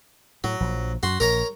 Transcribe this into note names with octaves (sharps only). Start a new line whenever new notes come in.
A2 F#3
A#1 F3
F#2 F#4 C6
A#1 A#4 C#5 A#5